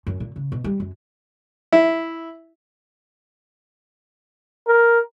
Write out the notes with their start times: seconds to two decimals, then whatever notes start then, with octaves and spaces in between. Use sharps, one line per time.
0.07 F#2
0.20 A#2
0.36 C#3
0.52 B2
0.64 G3
0.80 F#2
1.72 E4
4.68 A#4